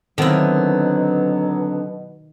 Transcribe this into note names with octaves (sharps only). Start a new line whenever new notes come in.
B2 D3 D#3 F#3 B3 C4 E4